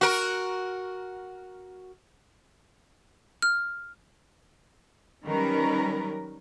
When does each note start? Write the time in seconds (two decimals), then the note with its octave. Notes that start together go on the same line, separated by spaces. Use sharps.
0.01 F#4 A#4
3.42 F6
5.25 D#3 F#3 G3 C#4 A#4 B4